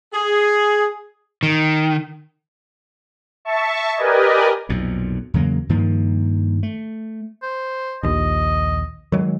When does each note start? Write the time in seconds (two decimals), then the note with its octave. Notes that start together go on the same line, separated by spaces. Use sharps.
0.13 G#4
1.43 D#3
3.45 E5 A5 C#6
3.96 G4 A#4 B4 D5 D#5 G#5
4.69 B1 F2 A#2
5.34 E2 C#3 F#3 A#3
5.69 G2 D#3 F3 A#3
6.63 A3
7.43 C5
8.03 A#1 D#2 D#5
9.12 D#3 F#3 G#3